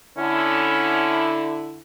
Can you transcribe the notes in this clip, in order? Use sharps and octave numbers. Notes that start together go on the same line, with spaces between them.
D3 C#4 E4